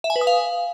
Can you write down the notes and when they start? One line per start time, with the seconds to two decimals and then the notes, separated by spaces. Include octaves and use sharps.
0.04 E5
0.10 G#5
0.16 B4
0.21 D#6
0.27 F5